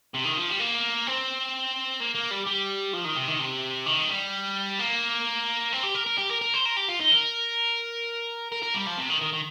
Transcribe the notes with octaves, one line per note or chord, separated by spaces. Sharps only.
C3
D#3
F3
G3
A#3
C4
A#3
A#3
G3
G3
F3
D#3
C3
D#3
C3
D#3
G3
A#3
C4
G4
A#4
A#4
G4
A#4
A#4
C5
A#4
G4
F4
D#4
A#4
A#4
A#4
G3
F3
C3
D#3
D#3
D#3